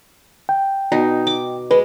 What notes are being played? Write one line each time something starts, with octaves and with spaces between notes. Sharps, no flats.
G5
B2 D#4
D6
G#3 B4